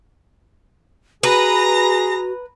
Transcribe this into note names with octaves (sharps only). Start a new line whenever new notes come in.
F#4 G#4 B4 A#5 A#6